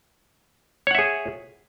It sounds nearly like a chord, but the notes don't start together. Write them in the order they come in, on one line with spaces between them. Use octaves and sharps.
C#5 F#5 E5 G#4